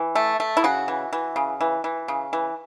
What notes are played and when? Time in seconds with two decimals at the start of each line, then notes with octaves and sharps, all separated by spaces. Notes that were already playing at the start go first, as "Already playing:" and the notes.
Already playing: E3
0.15 A3
0.40 A3
0.57 E4
0.64 C#3 F#4
0.88 E3
1.13 E3
1.36 C#3
1.61 E3
1.84 E3
2.08 C#3
2.33 E3